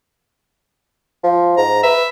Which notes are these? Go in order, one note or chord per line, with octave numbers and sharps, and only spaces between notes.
F3
G#2 A#5
B4 E5